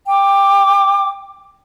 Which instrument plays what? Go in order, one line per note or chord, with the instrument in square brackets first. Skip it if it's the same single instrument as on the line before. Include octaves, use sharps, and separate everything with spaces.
[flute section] G5 D6